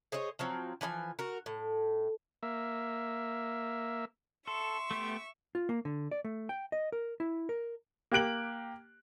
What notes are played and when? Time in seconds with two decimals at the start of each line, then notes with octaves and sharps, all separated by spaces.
0.12 G#4 C5 C#5 D#5
0.39 F3 F#3 C4
0.81 E3 F3 D5 G#5
1.19 F#4 A#4
1.46 A2
2.43 A#3 E5
4.47 A4 E5 C6 C#6
4.91 A3 B3 G4
5.55 F4
5.69 A#3
5.85 D3
6.11 D5
6.25 A3
6.49 G5
6.72 D#5
6.92 A#4
7.20 E4
7.49 A#4
8.12 A#3 G4 F#6 D7 F#7